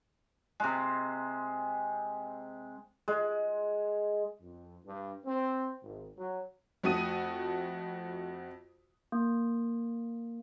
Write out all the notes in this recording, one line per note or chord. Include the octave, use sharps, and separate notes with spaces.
C3 G#3
G#3
F2
G2
C4
G#1
F#3
F2 A3 F#4 D#6 D#7
A#3